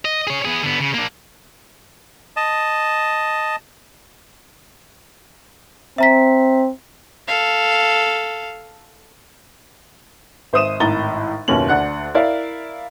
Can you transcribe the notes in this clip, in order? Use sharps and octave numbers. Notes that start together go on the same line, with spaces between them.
D#5
G#4 C#5
B3 G#4
D3 B3
C#3
A#3 D4
D#5 A5
C4 E5 A#5 B6
A4 F5
G#1 C5 E5 D#6 D#7 E7
G#1 A2 A#5 A6 G7
F#1 D#2 B2 C#4 F#7
D2 D4 F#5 F#6
E4 A#4 D5 F5